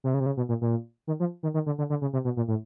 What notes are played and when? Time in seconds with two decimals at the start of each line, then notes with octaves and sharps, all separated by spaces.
0.04 C3
0.14 C#3
0.20 C3
0.26 C#3
0.37 B2
0.49 A#2
0.61 A#2
1.07 D#3
1.20 F3
1.43 D#3
1.54 D#3
1.66 D3
1.78 D3
1.90 D3
2.01 C#3
2.13 C3
2.24 B2
2.37 A#2
2.48 A2